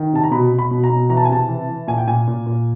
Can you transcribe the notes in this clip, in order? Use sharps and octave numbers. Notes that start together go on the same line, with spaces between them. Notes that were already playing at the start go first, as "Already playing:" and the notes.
Already playing: D#3
C3 A5
A#5
B2 B5
B2
B5
B2
A#5
B2
E3 A#5
A5
G#5
C3 A5
E3
E3
A#2 G#5
G5
A#2 G#5
A#2
A#2